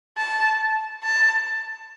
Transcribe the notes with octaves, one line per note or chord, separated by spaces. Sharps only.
A5
A5